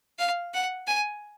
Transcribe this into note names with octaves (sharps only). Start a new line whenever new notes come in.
F5
F#5
G#5